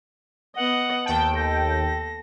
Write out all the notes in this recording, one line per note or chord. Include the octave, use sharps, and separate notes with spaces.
B3 D#5 F#5
D#2 G5 A5
A4 A#6